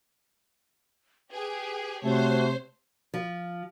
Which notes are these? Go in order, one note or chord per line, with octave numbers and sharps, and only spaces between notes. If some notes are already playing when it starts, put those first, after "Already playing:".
G4 G#4 B4
C3 A3 F#4 C5 C#5
F3